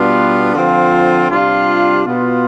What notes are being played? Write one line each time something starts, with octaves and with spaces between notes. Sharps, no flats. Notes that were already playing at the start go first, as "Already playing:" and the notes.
Already playing: B2 G3 B3 D4 F4
D3 F3 C4 F4
C3 G3 D4 F4
B2 B3 F4